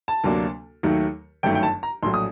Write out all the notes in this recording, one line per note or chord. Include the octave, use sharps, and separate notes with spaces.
A5
D2 C3 F#3 A#3 D4
D#2 D#3 F#3 A3
G1 F#2 D#3 F#3 A3 G5
G5
A5
A#5
A#1 A2 F#3 C6
D#6